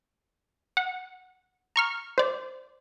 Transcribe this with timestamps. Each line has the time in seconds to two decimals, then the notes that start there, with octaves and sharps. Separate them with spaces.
0.77 F#5
1.76 A#5 C#6 F6
2.18 C5 D5